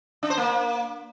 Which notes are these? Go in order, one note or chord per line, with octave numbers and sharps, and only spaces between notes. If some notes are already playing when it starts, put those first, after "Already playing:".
D4
C5
A#3